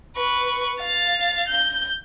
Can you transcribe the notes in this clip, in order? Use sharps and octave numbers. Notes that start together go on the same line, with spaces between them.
B4 C#6
F5 A6
G6